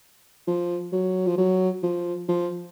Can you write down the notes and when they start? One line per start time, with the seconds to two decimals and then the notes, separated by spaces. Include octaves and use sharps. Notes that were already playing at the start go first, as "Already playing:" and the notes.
0.47 F3
0.93 F#3
1.27 F3
1.38 F#3
1.83 F3
2.28 F3